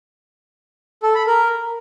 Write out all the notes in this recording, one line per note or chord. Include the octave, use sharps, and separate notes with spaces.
A4
B5
A#4